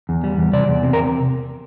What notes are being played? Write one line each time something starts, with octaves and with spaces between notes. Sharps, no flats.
E2
G3
E2
C3 D5
E2
C3
A#4